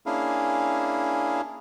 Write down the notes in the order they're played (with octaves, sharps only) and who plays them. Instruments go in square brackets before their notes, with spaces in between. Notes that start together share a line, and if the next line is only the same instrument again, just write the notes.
[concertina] A#3 C#4 D4 E4 G#4 F5